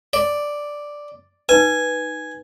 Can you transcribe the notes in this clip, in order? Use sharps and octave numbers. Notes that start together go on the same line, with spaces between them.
D5
D#4 B4 G#5